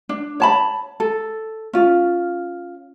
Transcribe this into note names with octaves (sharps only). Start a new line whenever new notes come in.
D4
C#5 A5 B5
A4
C#4 F4